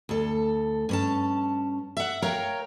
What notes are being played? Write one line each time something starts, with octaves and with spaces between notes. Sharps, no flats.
D2 A4
G2 C#4 A5
E5 F#5
A#4 C#5 F5 G5 A#5